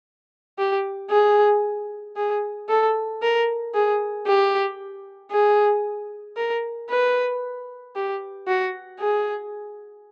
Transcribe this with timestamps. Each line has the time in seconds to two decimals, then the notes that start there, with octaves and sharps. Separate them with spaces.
0.59 G4
1.10 G#4
2.16 G#4
2.69 A4
3.22 A#4
3.74 G#4
4.27 G4
5.31 G#4
6.37 A#4
6.90 B4
7.95 G4
8.48 F#4
9.00 G#4